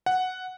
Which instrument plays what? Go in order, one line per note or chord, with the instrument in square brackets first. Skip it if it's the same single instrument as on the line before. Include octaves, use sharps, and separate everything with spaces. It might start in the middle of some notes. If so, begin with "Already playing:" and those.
[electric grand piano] F#5